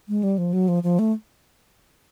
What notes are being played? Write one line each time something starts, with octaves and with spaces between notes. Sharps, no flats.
G#3
G3
F3
F#3
F3
F3
A3